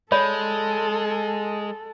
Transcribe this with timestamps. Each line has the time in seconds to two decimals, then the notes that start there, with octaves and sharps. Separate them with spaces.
0.12 G#3 A4 C#5 D5 B5